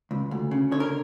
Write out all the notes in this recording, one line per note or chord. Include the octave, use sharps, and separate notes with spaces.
C#2
D2
C#3
D3 C#5
A#4